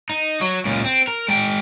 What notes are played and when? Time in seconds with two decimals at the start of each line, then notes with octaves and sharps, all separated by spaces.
0.10 D#4
0.41 F#3
0.65 C#2 A#2
0.84 C4
1.08 A#4
1.28 G#3 G5